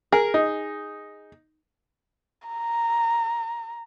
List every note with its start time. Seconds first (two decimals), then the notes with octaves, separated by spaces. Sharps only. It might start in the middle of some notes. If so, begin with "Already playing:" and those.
0.12 G#4 A#4
0.34 D#4
2.48 A#5